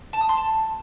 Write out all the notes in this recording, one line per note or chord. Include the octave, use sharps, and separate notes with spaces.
A5
D#6
C6
A5